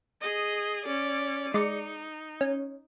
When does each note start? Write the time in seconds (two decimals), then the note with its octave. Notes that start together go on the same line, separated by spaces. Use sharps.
0.21 G#4 D#5
0.86 C#4 D5
1.54 G#3 D#4 D5 C#7
2.41 C#4